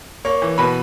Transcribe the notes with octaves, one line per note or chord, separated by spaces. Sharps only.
A#3 C#5 C#6
E3
B2 B4 B5